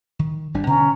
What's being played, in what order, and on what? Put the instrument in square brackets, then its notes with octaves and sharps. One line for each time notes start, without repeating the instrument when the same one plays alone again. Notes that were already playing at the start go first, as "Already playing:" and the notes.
[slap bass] D#3
G#1 G3 D4
[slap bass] B2 D3 [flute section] C#4 A#5